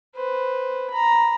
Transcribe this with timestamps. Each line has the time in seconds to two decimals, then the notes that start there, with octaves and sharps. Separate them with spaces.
0.15 B4 C5
0.90 A#5 B5